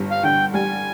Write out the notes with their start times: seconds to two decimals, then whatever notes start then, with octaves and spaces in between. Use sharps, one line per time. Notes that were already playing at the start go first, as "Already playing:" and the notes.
Already playing: G1 G2
0.11 F5
0.23 D3 G5
0.54 G3 G#5